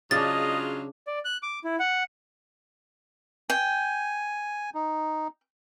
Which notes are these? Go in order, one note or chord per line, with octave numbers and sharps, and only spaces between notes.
C#3 F#3 G#3 D4 F4 D#5 A6
D5
F#6
D6
E4
F#5
G5 G#5
D#4